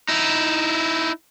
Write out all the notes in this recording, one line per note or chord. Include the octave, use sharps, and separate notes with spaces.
D#4 E4